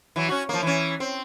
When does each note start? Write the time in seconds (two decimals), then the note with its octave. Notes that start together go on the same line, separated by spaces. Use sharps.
0.16 E3 F#3
0.29 C#4 F#4
0.49 F3 A#3
0.63 E3 C#4
1.00 C4